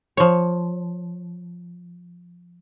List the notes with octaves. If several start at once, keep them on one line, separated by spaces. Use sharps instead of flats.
F3 C#5